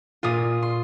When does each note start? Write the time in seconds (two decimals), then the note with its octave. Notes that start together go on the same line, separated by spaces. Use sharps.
0.23 A#2 A#3 F4 D#6
0.62 C6